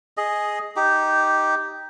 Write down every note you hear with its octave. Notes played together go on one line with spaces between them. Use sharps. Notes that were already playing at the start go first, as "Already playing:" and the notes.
G#4 D#5
D#4 G4